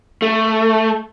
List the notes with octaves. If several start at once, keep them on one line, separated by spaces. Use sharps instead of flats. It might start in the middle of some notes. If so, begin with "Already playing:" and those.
A3